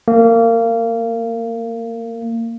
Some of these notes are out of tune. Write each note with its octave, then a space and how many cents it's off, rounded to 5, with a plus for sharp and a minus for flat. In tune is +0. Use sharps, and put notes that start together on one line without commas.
A#3 -25